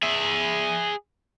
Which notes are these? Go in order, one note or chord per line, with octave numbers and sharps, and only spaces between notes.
G#4 E5